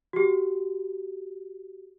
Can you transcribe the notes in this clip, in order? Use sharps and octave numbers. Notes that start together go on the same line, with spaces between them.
F#4 G4